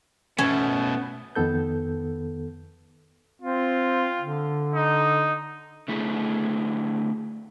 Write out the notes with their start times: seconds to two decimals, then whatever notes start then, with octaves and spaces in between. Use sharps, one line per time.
0.38 B2 A3 B3 C#4
1.35 F2 D#3 B3 A4 G6
3.42 C4 F4
4.20 D3
4.75 D#4
5.88 D3 A3 E4 G#4